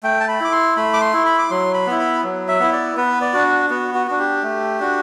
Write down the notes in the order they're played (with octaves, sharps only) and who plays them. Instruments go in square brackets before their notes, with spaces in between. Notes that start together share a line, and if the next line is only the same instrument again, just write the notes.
[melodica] A3 G5
A5
B5
E4 D6
C6
A3 B5
D6
C6
E4
B5
D6
F#3 C6
B5
B3 E4
B5
F#3
E5
B3 E4
D5
B3 B4
D5
D4 F#4
B3 F#4
F#4
D4 F#4
G4
A3
D4 F#4